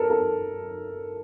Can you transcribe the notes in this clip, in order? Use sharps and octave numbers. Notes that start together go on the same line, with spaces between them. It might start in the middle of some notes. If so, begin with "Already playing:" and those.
Already playing: A4 A#4
A4